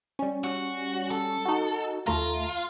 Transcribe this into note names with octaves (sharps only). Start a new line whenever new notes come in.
G3 C#4
F#4
A4
D#4 F#4
D#2 A3 F4 A#5